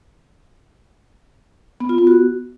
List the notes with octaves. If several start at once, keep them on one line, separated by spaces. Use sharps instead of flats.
B3
F4
B3
F#4